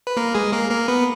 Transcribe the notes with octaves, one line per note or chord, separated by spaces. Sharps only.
B4
A#3 A#4
G#3 G#4
A#3 A#4
A#3 A#4
B3 B4